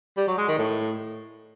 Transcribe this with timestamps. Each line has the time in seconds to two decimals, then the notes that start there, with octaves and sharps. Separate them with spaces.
0.17 G3
0.28 F#3
0.38 G#3
0.48 D#3
0.59 A2